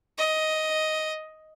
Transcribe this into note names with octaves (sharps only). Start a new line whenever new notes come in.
D#5